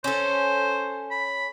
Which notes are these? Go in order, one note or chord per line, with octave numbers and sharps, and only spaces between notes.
C#4 A4 C5
B5